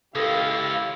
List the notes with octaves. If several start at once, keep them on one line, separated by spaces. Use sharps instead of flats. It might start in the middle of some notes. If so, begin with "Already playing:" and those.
C#2 E4 G4 A4 A#4 F5